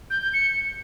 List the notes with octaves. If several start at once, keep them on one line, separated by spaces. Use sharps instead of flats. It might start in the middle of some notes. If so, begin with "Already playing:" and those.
G6
G6
C#7